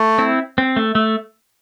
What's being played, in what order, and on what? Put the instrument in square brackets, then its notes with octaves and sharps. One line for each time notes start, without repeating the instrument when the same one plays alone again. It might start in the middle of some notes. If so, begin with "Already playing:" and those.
Already playing: [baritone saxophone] A3
[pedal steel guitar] C4 E4
C4
A3
A3